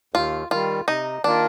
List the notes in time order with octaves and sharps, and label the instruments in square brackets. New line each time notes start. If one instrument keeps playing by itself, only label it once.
[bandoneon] D#2 [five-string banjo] F4
[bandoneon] D#3 G3 [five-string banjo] F4
[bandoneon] C3 [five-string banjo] D#4
[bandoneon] D#3 A#3 F4 A#4 [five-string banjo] D4